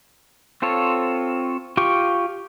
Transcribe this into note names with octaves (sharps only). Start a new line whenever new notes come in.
C4 F4 A4 C#5
F4 G4 G5 C#6